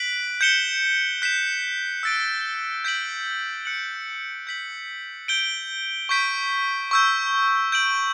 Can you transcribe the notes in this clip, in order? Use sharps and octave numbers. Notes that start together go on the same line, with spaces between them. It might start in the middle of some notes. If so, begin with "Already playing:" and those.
Already playing: F#6 B6 D7 F#7
G6 C#7 E7 G7
F#6 B6 E7
E6 A6 D7
G6 B6 D7 F#7
F#6 C#7 F#7
G6 B6 F#7
G6 D7 G7
C#6 G6 B6 D7
C#6 E6 G6
G6 D7 F#7